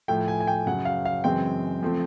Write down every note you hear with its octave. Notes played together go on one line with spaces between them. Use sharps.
A2 F3 A3 G5
G#5
G#5
G5
F#2 C#3 F#3 F#5
F5
F5
F#2 C#3 E3 G#3 C4 G5
F3 A3 C4